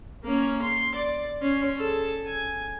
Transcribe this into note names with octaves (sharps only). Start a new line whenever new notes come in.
A#3 C#4
C6
D5
C#4 C6
G#4 A4
G#5